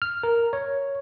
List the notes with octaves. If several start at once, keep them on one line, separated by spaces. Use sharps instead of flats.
F6
A#4
C#5